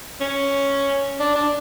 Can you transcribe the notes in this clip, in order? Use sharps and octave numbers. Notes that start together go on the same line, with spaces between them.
C#4
D4
D4